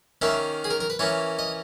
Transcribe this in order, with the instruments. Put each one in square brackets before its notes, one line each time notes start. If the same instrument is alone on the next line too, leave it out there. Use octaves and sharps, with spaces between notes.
[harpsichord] D#3 A#3 C#4 E5
G#4
A#4
A#4
B4
E3 A#3 C#4 C#5
D#5